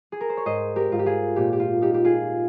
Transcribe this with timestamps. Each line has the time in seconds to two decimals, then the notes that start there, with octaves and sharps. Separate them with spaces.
0.12 G#4
0.21 A#4
0.30 C5
0.37 C#5
0.45 G#2 C5 D#5
0.76 G4 A#4
0.92 G#2 F4
0.99 G4
1.06 F4 G#4
1.36 A#2 G4
1.53 G4
1.60 F4
1.82 D#4 G4
1.94 G4
2.04 F4 G#4